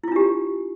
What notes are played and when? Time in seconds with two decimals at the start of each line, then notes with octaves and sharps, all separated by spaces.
0.04 E4
0.08 F4
0.12 D4
0.16 G4